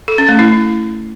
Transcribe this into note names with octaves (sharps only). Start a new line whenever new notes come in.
A4
C#4
A3
E4